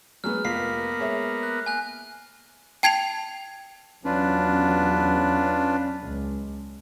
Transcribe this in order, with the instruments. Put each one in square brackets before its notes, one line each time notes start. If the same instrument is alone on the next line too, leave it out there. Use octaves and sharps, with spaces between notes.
[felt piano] F#3 G#3 B3 [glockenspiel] F6
[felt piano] F1 F4 B6 [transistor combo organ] A#3 B3 [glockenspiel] C7
[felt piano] G#3 C#5 E5
[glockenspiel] F#6
G#5 F#6
[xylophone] G5 A5 G#6 C7 C#7 F7
[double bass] E2 F#3 [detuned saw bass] C#4 [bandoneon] D4 F4 B4
[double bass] C#2